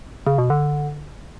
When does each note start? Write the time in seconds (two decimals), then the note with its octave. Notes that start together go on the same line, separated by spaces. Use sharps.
0.27 C#3
0.38 B2
0.50 D3